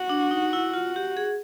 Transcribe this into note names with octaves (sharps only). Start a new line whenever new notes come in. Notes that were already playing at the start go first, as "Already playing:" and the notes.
Already playing: F#4
D4
D#4
E4
F4
G4
G#4